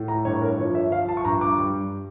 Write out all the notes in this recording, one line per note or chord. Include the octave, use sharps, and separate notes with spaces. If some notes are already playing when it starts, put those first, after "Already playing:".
Already playing: A2
A#5
G2 C#5
A#4
F3 C#5
E5
F3 F5
A5
C#6
G2 A#5
D6
G3